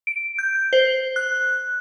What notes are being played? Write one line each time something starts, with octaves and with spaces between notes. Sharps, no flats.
D7
G6
C5
F#6